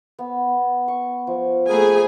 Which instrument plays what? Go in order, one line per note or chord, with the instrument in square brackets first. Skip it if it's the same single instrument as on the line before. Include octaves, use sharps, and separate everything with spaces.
[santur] B3
C#6
F3
[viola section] A3 G#4 G#5 [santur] A#4 B4 D#5